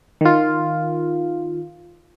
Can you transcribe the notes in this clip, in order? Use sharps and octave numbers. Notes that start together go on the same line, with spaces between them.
D#3 F4